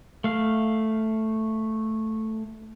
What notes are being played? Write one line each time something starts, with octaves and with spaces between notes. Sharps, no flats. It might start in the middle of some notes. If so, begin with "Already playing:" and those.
A3 F5